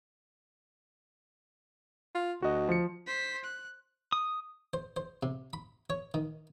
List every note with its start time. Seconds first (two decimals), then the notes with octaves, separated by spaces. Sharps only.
2.15 F4
2.42 D2 F#4 D#5
2.69 F3 C#7
3.07 C5 B6
3.44 F#6
4.12 D#6
4.74 C5
4.97 C5
5.23 C3
5.53 B5
5.90 C#5
6.14 D#3